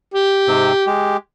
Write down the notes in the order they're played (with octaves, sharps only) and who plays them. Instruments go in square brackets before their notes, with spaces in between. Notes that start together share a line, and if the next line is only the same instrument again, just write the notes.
[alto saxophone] G4
[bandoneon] G#2 C3 C4
G#3 G4